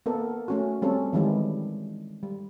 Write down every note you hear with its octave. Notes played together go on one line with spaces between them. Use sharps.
A#3 B3 A4 A#4
A3 C#4 F#4
G3 C4 C#4 A4
D#3 E3 G3 G#3
G3